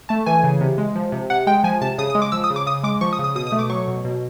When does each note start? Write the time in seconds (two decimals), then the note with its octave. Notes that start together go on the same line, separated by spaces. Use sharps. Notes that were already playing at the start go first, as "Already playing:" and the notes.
0.09 A3 A5
0.26 E3 G#5
0.44 C#3
0.61 C3
0.78 G#3
0.96 F3
1.12 C3
1.30 C3 F#5
1.47 G#3 G5
1.64 F3 G#5
1.81 C3 A5
1.98 C#3 D#6
2.10 D#6
2.15 G#3
2.22 D6
2.32 F3 E6
2.44 D#6
2.50 C#3
2.56 D6
2.66 C#3 D#6
2.83 G#3 D6
3.01 F3 C#6
3.13 D#6
3.19 C#3
3.24 D#6
3.35 B2 D#6
3.47 D#6
3.52 A3
3.59 D6
3.69 F#3 C#6
3.87 B2
4.05 B2